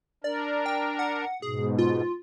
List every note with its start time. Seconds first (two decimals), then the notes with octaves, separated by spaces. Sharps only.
0.24 D4 A#4 D5
0.66 G5
0.99 F#5
1.42 G#2 B2 G#4
1.78 F4